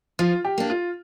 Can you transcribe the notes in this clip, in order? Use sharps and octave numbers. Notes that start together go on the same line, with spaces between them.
F3 F4
G4
A#3 D4
F4